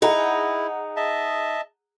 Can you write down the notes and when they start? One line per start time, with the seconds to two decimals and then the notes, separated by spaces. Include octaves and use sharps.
0.02 D#4 E4 G#4 F#5 A#5
0.96 D#5 E5 A5